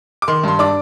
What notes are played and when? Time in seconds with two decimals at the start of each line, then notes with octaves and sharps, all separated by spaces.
0.22 D6
0.28 D#3 C6
0.44 G2 C6
0.59 D4 D6